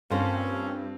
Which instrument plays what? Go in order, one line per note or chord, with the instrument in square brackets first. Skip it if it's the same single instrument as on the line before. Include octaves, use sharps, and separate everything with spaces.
[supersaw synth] G2 [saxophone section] A#3 C#4 [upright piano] C4 F4 [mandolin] A4 C5